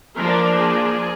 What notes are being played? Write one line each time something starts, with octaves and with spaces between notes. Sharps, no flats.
F3 A#3 D4 A#4
G#4